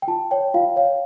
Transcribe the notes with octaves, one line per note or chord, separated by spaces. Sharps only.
G5
F4 A5
C#5 G5
F4 F5
C#5 F5